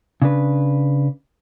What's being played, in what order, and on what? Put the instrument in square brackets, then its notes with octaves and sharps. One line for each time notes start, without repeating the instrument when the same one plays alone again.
[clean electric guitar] C#3 D4 B4